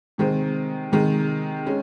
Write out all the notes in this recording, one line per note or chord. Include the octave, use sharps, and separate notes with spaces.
C3 D#3 G#3 C4
C3 D#3 G#3
G#3 C#4